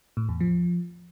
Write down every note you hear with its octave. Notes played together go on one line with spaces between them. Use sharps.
A2
E2
F3